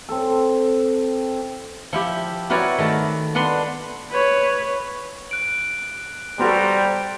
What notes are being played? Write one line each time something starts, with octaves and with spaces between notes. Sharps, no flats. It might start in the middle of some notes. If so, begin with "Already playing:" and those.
C4 A4
F3 E4 G4
E4 F#4 A#4 B4 C#5 D5
D#3 A3 A5
B3 D4 F#5 B5 C6
B4 C#5
F#6 D7 F#7
G3 B3 F#4 A4 C5 A#5 C6